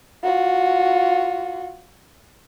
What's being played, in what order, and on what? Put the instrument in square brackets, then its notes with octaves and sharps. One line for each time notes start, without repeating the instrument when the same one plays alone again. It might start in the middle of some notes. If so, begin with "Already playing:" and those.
[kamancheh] F4 F#4